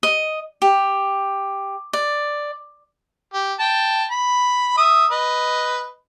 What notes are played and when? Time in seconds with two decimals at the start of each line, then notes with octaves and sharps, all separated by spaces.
0.03 D#5
0.62 G4
1.93 D5
3.34 G4
3.59 G5 A5
4.11 B5
4.77 E5 D#6
5.11 B4 D#5